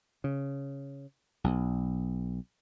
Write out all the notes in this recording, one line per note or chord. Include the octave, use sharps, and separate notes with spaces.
C#3
B1